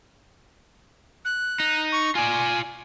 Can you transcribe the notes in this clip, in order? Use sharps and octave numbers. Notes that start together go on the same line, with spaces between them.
F#6
D#4
C#6
F4 D5 G#5